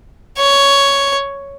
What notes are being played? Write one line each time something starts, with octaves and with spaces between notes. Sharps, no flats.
C#5